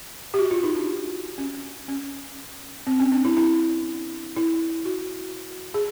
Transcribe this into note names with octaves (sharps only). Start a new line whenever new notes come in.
G4
F#4
F4
D#4
D4
C#4
C#4
C4
C#4
D4
E4
E4
E4
F#4
G#4